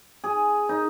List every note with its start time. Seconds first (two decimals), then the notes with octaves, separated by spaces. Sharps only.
0.24 G#4
0.69 D#4